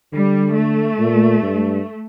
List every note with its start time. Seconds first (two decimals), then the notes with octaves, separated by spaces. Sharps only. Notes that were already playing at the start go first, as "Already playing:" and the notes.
0.13 D3 G3
0.56 A3
0.99 A#2
1.42 G2